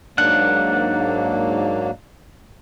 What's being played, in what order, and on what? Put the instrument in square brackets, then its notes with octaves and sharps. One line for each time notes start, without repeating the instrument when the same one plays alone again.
[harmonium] G#2 F#3 A#3 [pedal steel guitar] D4 F#5